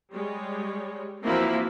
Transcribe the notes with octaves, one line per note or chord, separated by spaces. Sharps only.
G3 G#3 C#5
E3 F3 A#3 C4 E4 F#4